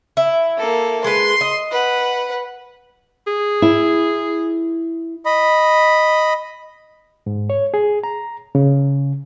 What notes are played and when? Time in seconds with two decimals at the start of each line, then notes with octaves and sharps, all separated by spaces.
0.17 E4
0.58 A#3 A4
1.04 G#3 B4 C6
1.41 D#5
1.71 B4 F#5
3.27 G#4
3.62 E4
5.26 D#5 B5
7.26 G#2
7.50 C#5
7.74 G#4
8.03 A#5
8.55 C#3